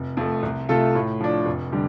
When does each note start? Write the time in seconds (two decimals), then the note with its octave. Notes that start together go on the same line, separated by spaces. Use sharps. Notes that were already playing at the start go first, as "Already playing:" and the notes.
Already playing: F1
0.17 F2 F3 A3
0.43 C2
0.69 C3 A3 F4 A4
0.95 A2
1.20 F3 D4
1.46 F1
1.72 D3 G3